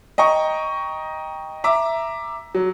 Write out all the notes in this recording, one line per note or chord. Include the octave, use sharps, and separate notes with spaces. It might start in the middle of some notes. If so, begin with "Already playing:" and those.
D#5 G5 A#5 C#6
E5 A#5 D6
F#3